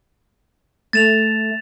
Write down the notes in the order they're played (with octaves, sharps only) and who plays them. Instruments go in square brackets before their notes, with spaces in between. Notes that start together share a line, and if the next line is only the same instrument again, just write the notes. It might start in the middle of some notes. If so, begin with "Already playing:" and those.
[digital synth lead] A3 [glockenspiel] A6 E7 F7